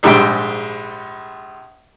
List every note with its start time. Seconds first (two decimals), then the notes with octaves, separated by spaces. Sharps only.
0.03 A#1 G#2 G3 G#3 E5 G5